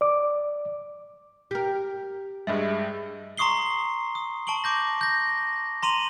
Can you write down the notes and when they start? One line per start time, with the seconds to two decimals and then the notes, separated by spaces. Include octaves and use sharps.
0.01 D5 D6
1.51 G4 A#4
2.47 G2 G3 G#3 G#4 D#5 E5
3.37 A#5 C6 C#6 D#6 C7 G7
4.15 D#6
4.47 A5 C#6 D7 F#7 G7
4.64 C#6 D6 G6 A#6
5.01 G6 A#6
5.83 A#5 C6 D#7 F7 F#7